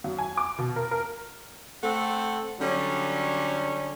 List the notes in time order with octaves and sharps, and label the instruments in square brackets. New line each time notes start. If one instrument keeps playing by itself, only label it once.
[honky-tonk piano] F#2
G#5
D6
B2
A#4
A#4
[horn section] A3 C4 A4 F#5
D3 F#3 G3 C#4